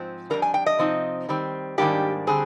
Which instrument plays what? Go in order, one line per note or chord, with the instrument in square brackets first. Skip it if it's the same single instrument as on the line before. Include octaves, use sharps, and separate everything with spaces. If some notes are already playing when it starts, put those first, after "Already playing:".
Already playing: [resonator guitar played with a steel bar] G#2 F3 C4
F2 D#3 G3 D4 A#4
G#5
G5
D#5
C3 F3 C4 D#4
D#3 G3 C4
G#2 D#3 G3 A#3 D4 G4
D3 G3 C4 G#4